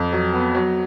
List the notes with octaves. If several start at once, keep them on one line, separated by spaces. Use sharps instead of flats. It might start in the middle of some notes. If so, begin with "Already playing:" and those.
Already playing: F2
F#3
B3
F#3